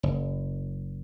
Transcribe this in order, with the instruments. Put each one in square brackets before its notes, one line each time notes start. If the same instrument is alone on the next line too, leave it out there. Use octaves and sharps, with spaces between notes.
[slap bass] F#1